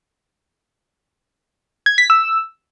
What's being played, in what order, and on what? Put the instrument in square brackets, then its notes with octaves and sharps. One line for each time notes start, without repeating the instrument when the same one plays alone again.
[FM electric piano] G#6
B6
E6